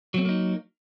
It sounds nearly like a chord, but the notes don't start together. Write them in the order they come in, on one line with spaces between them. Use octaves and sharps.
F#3 C4 A3 A#3 D#4